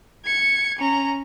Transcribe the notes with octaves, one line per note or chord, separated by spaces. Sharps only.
G#6 C#7
C#4 A#5